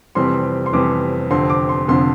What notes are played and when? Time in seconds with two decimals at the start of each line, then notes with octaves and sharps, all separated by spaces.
0.15 F1 F2 E3 G3 C4 C6
0.66 C6
0.73 F1 F2 E3 G3 C4 D6
1.31 F1 F2 D3 F3 C4 C6
1.50 D6
1.69 C6
1.88 F1 F2 D3 F3 C4 C6